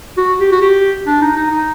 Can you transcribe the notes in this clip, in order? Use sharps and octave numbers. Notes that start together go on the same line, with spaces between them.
F#4
G4
F#4
G4
D4
D#4
D#4
D#4